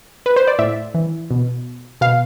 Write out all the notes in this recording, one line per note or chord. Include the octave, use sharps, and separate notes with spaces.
B4
C5
D5
A2 E5
E3
B2
B2 F5